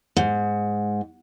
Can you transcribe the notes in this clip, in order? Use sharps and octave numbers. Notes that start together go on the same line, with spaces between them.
G#2